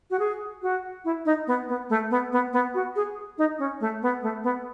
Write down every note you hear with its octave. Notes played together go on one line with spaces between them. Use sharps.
F#4
G#4
F#4
E4
D#4
B3
B3
A3
B3
B3
B3
F#4
G#4
D#4
C#4
A3
B3
A3
B3